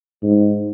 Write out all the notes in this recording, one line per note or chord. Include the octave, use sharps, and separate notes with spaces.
G#2